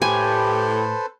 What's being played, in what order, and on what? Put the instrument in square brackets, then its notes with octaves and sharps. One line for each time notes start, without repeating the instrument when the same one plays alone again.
[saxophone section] A2 [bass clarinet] G4 [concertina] A4 B4 C5 [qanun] G#5